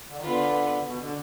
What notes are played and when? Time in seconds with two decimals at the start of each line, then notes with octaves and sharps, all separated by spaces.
0.09 D3
0.16 D#3
0.24 D3 B3 F4 B4
0.85 B2
1.01 D3